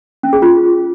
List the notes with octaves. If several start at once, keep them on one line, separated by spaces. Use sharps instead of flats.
C#4
G#4
F4